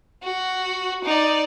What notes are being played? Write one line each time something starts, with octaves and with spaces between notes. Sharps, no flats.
F#4
D#4 D5